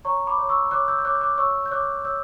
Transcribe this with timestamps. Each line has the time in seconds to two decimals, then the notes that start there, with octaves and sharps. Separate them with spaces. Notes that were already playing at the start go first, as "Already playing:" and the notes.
0.05 C#5 A#5 C#6
0.27 B5 D6
0.38 C#5
0.49 C#6 E6
0.71 C#5 D6 F#6
0.88 E6 G6
0.98 G6
1.04 C#5 D6 F#6
1.15 G6
1.21 D6 F#6
1.38 C#5 C#6 E6
1.66 G6
1.71 C#5 D6 F#6
2.04 C#5 E6 G6